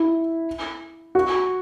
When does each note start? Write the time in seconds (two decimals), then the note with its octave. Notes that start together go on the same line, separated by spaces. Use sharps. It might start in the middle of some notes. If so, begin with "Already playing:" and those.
Already playing: E4
1.15 F#4